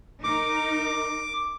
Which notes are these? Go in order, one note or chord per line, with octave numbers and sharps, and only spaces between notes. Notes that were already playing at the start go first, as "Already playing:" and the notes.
D#4 A#4 D6